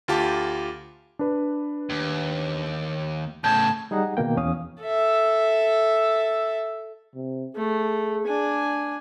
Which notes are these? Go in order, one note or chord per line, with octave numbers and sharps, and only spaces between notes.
D2 F4 G4 A5 D6
D4 B4
D#2
A2 C#3 A5 G6 G#6
G3 D#4 G#4 F#5 A#5
B2 D#3 A#3 G5
E2 C#4 F5 D#6
A4 E5
C3
A3 G#4
D4 G#5